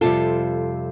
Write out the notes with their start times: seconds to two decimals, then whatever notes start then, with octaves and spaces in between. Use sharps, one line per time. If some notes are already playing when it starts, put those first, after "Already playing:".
0.01 F2 C3 G3 F4 A4